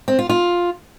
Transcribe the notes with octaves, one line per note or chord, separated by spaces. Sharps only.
C4
F4
F4